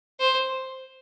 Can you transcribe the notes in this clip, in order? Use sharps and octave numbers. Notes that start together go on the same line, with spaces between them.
C5